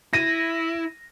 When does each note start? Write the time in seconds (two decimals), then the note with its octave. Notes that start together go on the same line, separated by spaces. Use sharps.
0.13 E4 A#6 D#7